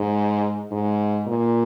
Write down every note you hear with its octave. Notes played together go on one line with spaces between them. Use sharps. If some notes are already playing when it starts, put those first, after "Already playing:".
Already playing: G#2
G#2
A#2